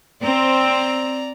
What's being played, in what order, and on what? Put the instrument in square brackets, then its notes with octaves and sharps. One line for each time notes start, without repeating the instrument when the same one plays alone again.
[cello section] C4 [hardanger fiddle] D5 A#5